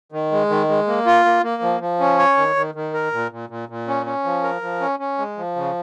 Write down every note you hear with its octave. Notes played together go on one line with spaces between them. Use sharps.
D#3
G#3
D#3
G#3
A#3
F4
A#3
A#3
F3
F3
C#4
C#5
D#3
D#3
D#3
A#4
A#2
A#2
A#2
A#2
C#4
C#4
F3
A#4
F3
C#4
C#4
G#3
F3
C#3